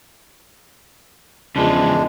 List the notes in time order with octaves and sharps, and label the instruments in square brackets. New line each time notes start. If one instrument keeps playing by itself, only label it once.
[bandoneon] E2 G#3 D4 [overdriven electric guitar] C#3 F3